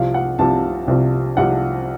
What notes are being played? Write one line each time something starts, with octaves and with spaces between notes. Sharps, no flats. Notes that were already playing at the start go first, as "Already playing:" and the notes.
Already playing: C2 C3 F3 F5
F#5
C2 C3 F3 A5
C2 C3 F3
C2 C3 F3 F#5